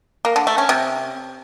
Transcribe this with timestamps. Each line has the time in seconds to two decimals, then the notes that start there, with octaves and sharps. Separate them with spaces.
0.25 A#3
0.36 D3
0.47 A3
0.58 C#4
0.69 C3